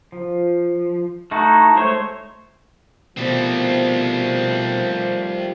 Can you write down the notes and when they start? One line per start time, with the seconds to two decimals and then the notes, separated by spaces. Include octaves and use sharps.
0.12 F3
1.31 A3 D#4 E4 F#4
1.76 G#3 A3 C5 C#5
3.17 B2 D#3 F3 G3 A3 C4